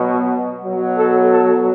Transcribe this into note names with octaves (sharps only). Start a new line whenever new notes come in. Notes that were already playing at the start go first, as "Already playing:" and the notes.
Already playing: B2 F#3
B2 F#3
A4
A4